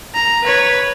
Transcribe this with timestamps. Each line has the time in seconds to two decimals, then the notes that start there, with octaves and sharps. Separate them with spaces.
0.14 A#5
0.44 B4 C#5